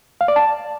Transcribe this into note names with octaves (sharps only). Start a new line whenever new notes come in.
F5
D5
A5